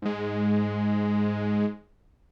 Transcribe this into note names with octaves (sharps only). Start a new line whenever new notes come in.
G#2 G#3